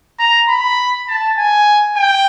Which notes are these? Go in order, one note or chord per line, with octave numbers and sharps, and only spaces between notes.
A#5
B5
A5
G#5
G5